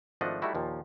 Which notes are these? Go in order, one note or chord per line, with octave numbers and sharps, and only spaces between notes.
G#1 F3 A3 D4 D#5 F#5
G3 A3 D#4 E4 F#4
D#2 A#2 F3